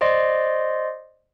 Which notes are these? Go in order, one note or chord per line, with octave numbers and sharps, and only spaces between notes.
C5 D5 D#5 C6